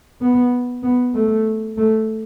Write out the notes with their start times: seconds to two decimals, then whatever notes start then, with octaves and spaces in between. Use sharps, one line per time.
0.21 B3
0.83 B3
1.14 A3
1.78 A3